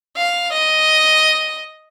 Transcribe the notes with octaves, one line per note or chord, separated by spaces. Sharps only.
F5
D#5